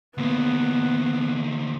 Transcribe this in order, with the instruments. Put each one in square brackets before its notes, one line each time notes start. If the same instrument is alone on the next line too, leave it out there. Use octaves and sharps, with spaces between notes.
[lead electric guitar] D2 A#3 [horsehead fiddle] B3